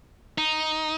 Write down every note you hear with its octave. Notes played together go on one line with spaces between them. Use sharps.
D#4